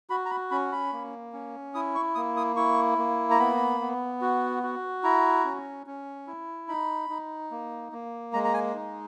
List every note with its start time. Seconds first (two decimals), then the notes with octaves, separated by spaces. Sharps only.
0.10 F#4 B5
0.26 A#5
0.30 B5
0.51 C#4 B5
0.72 B5
0.92 A#3
1.33 C#4
1.74 E4 D#6
1.95 C#6
2.15 A#3 D#6
2.37 D#6
2.56 E4 C#6
2.98 A#3
3.31 A#5
3.39 B3 B5
3.80 B3
4.21 F#4
4.63 F#4
5.03 E4 A#5
5.45 C#4
5.87 C#4
6.27 E4
6.68 D#4 B5
7.10 D#4
7.51 A#3
7.92 A#3
8.33 G#3 A#5
8.44 A#5
8.54 G#5
8.74 D#4